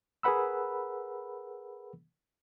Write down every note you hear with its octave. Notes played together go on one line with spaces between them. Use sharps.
G#4 A#4 B4 F#5 B5 E6